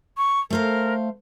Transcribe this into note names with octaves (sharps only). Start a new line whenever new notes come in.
C#6
A3 A#4 C5 F5